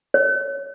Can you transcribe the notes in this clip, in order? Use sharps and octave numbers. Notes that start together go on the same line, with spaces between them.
C#5